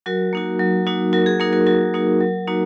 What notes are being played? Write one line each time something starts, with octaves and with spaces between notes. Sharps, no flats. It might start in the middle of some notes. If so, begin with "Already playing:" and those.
F#3 F#4 A#4
A#3 D#4 F#4
F#3
A#3 D#4 F#4
F#3 F#4 A#4
G#4
A#3 D#4 F#4 A#4
F#4 A#4
F#3 F#4 A#4
A#3 D#4 F#4
F#3
A#3 D#4 F#4